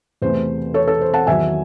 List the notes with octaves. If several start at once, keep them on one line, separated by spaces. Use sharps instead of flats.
E2 C3 E3 A3 C5
A4 C#5
A4
C5
F#5 A5
E2 D#3 F#3 E5 G#5